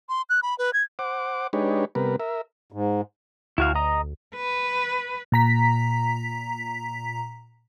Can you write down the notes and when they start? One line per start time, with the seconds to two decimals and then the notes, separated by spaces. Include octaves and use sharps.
0.09 C6
0.30 F#6
0.43 B5
0.58 B4
0.73 G#6
0.99 C5 F#5 D6
1.53 G#3 D4 D#4 G4 B4 C#5
1.95 C3 G3 B3 A#4 B4
2.20 A#4 E5
2.72 G#2
3.58 D2 E4 F#4 F5
3.76 D#5 A#5 D#6
4.36 B4
5.32 A#2 A#5 B6